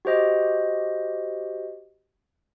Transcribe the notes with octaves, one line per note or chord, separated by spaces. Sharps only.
F#4 G4 C5 D#5